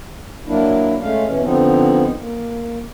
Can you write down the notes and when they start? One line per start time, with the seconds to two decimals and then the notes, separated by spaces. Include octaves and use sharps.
0.47 F#3 A#3 D4 E4
1.01 G#3 A3 C#4 F5
1.26 B2 E3 C#4
1.43 D3 F3 B3 C4 D#4
2.19 A#3